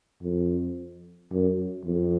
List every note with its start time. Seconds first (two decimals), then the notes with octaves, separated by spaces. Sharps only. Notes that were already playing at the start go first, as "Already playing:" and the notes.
0.23 F2
1.32 F#2
1.85 F2